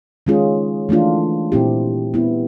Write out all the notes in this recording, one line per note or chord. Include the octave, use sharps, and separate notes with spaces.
D#3 G#3 C#4 F4 G#4
E3 A3 D4 F4
A#2 G3 C4 E4 G4
G3 B3 E4